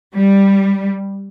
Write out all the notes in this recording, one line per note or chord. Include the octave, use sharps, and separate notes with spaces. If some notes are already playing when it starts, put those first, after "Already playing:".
G3